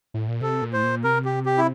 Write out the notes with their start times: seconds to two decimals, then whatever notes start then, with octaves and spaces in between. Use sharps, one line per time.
0.14 A2
0.28 A#2
0.41 C3 A4
0.62 A#2
0.73 A2 C5
0.83 A#2
1.04 C3 A#4
1.25 G4
1.46 G4
1.58 E4